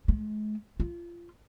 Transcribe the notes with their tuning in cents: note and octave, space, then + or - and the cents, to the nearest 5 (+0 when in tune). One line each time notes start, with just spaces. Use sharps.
G#3 +40
F4 -25